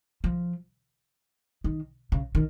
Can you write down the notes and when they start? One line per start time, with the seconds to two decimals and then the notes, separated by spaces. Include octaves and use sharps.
0.24 F3
1.64 D#3
2.12 C#3
2.35 D#3